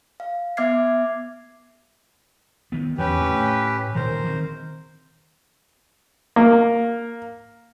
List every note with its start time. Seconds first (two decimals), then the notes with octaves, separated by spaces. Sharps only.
0.20 F5
0.57 B3 E5 D6 F6 G#6 C7
2.72 D#3 B3
2.98 E2 D3 C#4 G4 B4
3.20 A2 A3
3.95 D2 A#2 D#3 A#4 C5
4.24 D#3 C4
6.36 A#3